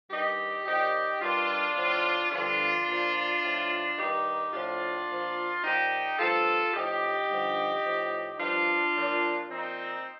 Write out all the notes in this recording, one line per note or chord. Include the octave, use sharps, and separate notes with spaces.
G2 D#3 D#4 G4
A#2 F3 D#4 G4
G2 D#3 D4 F4
A2 F3
G2 D3 F3 D4 F4
A#2 F3
A2 F3
G2 D#3 D#4 G4
A2 F3 D4 F4
A#2 F3
A#2 F3 D#4 G4
G2 F3 F4 A4
A2 F3 D#4 G4
G2 D3 F3
A2 F3
G2 F3 D4 F4
A#2 F3
A#2 F3 C4 D#4